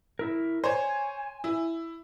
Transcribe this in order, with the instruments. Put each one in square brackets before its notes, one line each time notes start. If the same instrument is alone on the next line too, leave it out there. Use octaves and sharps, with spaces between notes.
[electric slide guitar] E4 A#4
[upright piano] C5 C#5 [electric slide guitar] G#5
[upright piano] E4